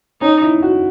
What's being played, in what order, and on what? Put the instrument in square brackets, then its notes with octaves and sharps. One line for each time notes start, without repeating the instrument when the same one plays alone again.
[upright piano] C#4 [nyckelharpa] D#4
[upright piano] E4
F#4